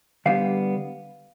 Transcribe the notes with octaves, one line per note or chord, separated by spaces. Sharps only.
D3 G3 B3 D4 F5